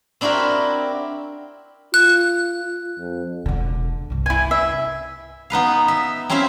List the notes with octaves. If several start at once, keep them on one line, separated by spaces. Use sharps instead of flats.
C4 D4 E4 F#4 G4 A#4
F4 F#6
F2
E1 D3
C2 G2
E4 G#5
E5
B3 D#4 B4 F5
E5
C4 C#4 E4 C5 E5 F5